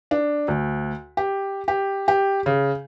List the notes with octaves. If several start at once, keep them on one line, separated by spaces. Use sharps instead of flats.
D4
D2
G4
G4
G4
C#3